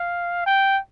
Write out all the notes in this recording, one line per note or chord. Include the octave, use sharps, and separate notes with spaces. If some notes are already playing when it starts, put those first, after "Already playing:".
Already playing: F5
G5